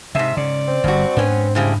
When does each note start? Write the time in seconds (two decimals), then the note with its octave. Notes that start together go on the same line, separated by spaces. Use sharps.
0.15 F2 G#2 C3 E5
0.37 C#3 D5
0.68 C4
0.84 G1 G2 G3 F#4
1.17 G#2 B3 C#4 D4
1.55 A2 C#3 G3 C4